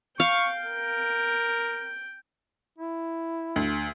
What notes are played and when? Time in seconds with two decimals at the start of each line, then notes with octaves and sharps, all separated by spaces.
0.20 F5 G5 C#6
0.66 A#4
2.78 E4
3.56 D2